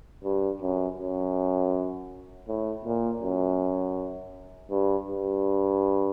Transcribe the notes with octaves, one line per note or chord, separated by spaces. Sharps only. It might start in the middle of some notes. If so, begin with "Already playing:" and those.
G2
F#2
F#2
A2
A#2
F#2
G2
G2